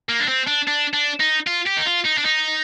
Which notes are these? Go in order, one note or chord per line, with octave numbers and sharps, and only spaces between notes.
A#3
D4
C4
D4
D4
D4
D#4
F4
G4
D#4
F4
D#4
D4
D#4